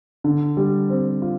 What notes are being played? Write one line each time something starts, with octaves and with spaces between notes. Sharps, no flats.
D3
G3
C4
F4